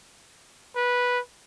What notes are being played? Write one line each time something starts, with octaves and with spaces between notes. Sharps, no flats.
B4